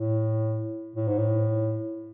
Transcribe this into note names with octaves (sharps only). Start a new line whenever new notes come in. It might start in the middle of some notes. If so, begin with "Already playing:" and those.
Already playing: A2
A2
G#2
A2